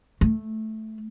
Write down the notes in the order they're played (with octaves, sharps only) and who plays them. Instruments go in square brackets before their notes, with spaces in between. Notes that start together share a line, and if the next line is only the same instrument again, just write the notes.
[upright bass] A3